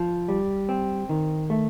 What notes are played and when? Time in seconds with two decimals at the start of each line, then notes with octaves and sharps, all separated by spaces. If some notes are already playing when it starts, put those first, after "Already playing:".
Already playing: F3
0.28 G3
0.69 C4
1.09 D#3
1.50 A3